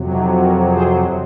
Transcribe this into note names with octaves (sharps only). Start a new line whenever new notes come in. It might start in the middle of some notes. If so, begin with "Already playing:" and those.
Already playing: F2 C3 F#3
D#4 F#4
F#4 A#4
G#4 C5